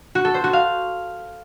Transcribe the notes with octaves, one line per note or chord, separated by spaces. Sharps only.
F#4
A4
C5
F#4
F5